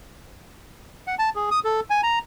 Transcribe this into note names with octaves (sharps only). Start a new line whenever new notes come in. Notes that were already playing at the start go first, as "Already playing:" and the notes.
F#5
A5
G#4
D#6
A4
G#5
A#5